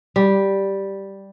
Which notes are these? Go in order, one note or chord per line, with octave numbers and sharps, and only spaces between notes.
G3